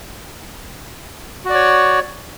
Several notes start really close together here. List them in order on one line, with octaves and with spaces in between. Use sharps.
F#4 D5 C#5